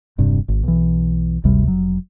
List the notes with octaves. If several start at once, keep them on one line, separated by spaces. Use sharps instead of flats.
E1 G2 C3
G#1
B1 E3
G#1 D2 C3 G3
F1 F#3